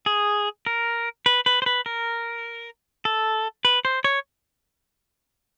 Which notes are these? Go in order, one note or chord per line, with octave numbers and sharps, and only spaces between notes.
G#4
A#4
B4
B4
C5
B4
A#4
A4
B4
C5
C#5